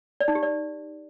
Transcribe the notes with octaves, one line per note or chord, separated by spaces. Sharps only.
D5
D#4
G4
D5